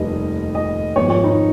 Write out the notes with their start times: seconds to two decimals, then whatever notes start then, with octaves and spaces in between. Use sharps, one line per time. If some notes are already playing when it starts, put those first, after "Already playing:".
Already playing: F1 D#2 D#3 G3 D#5
0.55 D#5
0.96 G#1 G#2 F3 C#5
1.10 C#5
1.24 D#4